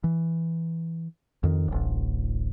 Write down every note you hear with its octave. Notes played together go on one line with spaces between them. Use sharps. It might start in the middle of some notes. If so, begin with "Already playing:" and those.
E3
F2 D#3
D1 A1